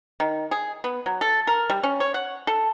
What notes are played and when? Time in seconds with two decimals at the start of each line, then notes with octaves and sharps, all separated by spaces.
0.20 D#3
0.51 G#4
0.84 B3
1.06 F#3
1.21 A4
1.47 A#4
1.70 G3
1.83 C#4
2.00 C#5
2.14 F#5
2.47 A4